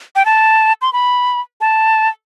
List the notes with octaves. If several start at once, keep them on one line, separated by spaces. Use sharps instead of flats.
G5
A5
C6
B5
A5